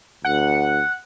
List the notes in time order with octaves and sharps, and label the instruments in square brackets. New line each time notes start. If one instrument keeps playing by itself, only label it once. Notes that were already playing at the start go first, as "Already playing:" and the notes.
[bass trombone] D2 [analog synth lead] F#5